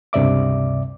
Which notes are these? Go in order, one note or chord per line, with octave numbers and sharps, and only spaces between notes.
C#2 G2 C3 D5 E5 D6